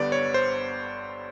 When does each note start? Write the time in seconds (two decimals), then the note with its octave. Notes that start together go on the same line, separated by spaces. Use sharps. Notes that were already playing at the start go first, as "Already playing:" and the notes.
Already playing: G1 G2 D3 G3 B3 D5
0.12 C#5
0.34 C5